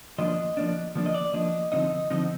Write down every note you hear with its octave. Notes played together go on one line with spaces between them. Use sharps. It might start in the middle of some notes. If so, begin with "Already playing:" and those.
F3 A#3 D4 D#5
F3 A#3 D4
F3 A#3 D4
D#5
D5
F3 A#3 D4 D#5
D3 F3 C4 D#4 D#5
D3 F3 C4 D#4 D#5